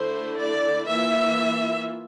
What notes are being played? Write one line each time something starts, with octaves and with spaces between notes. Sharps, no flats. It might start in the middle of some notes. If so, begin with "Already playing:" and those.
Already playing: D3 A3 E4 C5
D5
E3 A#3 F4 E5